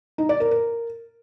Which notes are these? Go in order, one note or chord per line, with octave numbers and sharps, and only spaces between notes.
D#4
D5
A#4
A#4